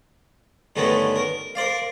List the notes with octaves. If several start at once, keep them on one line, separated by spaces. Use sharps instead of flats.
G2 D3 D#3 A3 B3 C#4
A#4
A#4 C5 D5 F5